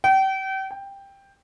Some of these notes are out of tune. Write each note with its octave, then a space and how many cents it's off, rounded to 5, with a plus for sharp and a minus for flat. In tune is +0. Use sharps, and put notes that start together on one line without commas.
G5 -35
G5 +10